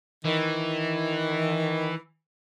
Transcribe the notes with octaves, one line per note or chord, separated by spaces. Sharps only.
D#3 E3